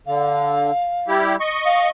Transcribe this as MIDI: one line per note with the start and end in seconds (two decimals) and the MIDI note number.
0.07 0.71 50
0.07 1.10 77
1.08 1.36 55
1.08 1.36 64
1.08 1.36 67
1.40 1.90 75
1.40 1.90 85
1.65 1.87 77